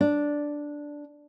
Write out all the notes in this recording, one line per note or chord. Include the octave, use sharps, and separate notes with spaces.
D4